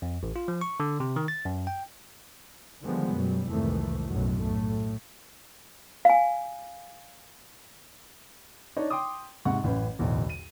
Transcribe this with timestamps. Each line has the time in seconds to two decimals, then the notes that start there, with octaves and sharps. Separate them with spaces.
0.02 F2
0.23 A1
0.36 F4
0.48 F3
0.61 C#6
0.80 D3
1.00 C3
1.16 D#3
1.28 A6
1.45 F#2
1.67 G5
2.84 D3 D#3 F3 G3 G#3 B3
3.15 F#2 B2 F#3 G3
3.49 C2 F2 G#2 D#3 E3 A3
4.09 B1 F#2 A2 F#3
4.43 A2 A3
6.05 F5 G#5
8.76 D4 D#4 C#5 D#5
8.90 G5 C6 D6 D#6
9.45 G#2 C3 F#5 C#6
9.64 A1 F#2 B4
9.99 D1 B1 E2
10.29 D#7